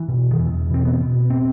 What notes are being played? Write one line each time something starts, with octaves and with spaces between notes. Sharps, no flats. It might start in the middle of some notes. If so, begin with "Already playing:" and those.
Already playing: E3
B2
D#3
E2 E3
B2 C4
B3
B2
C4